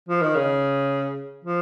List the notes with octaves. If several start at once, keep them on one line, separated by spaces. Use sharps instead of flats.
F3
D#3
C#3
F3